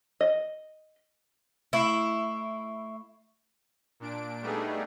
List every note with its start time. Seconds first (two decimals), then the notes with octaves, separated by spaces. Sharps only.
0.21 D#5
1.73 A3 E4 C#6 C7
4.00 A#2 D4 D7
4.41 G3 A3 B3 D4 D#4 G#4